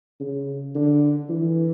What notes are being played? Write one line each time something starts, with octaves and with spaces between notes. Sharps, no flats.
C#3
D3
E3